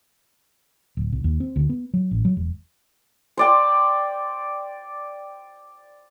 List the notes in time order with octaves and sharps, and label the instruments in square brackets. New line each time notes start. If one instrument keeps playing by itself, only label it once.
[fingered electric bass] D1
C2
D#2
C4
D2
B3
F#3
A1
F#3
E1
[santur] C5 D5 G5